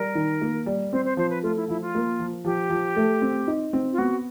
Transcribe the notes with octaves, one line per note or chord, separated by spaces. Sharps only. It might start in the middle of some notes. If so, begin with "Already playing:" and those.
Already playing: G3 A#4
D#3
A#3
G3
C4 C5
C5
F3 C5
B4
A3 F4
E4
F3 E4
F4
A#3
F3
F3 G4
F3
A3
C4
D#4
C4
F4
B3 F#4